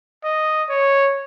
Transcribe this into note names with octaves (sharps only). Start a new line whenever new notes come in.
D#5
C#5